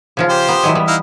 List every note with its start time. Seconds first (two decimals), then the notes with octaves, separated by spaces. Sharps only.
0.17 C#3 F3 F4
0.29 G4 C5
0.48 B3 A#5
0.63 E3 F#3 G#3
0.75 G3 B3
0.87 D#4 E4 F5